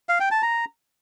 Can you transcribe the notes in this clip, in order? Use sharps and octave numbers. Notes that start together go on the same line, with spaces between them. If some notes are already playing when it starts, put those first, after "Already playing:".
F5
G5
A5
A#5